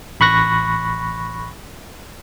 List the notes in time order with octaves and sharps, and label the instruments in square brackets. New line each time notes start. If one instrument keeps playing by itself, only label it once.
[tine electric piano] A1 B5 C#6 F#6 A#6